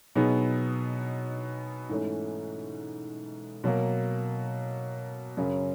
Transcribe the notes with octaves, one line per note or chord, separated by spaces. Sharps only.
B2 F#3 B3 D#4 G#4
G#2 E3 A3 C#4
B2 F#3 A#3
F#2 C#3 F#3